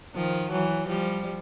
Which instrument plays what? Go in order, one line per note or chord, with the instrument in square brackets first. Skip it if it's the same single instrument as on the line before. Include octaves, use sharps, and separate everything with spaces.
[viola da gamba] D#3 F3
E3 F#3
F3 G3